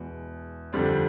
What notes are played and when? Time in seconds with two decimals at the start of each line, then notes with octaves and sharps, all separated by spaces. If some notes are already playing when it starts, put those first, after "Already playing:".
Already playing: E2 B2 G#3
0.73 F2 D3 G3 C4